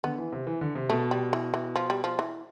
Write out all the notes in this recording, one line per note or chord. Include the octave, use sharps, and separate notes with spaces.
D3 B3
E3
C3
E3
D3
C3
B2 A3
G3
E3
E3
F3
G3
F3
E3